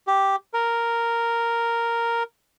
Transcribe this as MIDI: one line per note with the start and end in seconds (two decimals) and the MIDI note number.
0.07 0.36 67
0.53 2.23 70